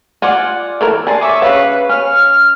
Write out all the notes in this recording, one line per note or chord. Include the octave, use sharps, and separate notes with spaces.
F4 D5 F#5 G#5
E3 A4 A#4
D4 G#4 A5 C6
C#5 E5 D6 D#6
C#3 B4 C#5 F5
C#4 F6